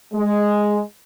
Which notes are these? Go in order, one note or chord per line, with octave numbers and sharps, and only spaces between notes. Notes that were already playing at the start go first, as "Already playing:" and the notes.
G#3